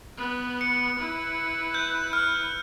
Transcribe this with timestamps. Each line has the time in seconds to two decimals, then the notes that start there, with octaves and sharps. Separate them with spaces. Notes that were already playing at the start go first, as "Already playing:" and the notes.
0.18 B3 B4
0.61 C#7
0.98 E4 B4
1.74 F#6 G6
2.13 F6